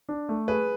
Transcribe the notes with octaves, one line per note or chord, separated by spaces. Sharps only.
D4
A3
G#4 B4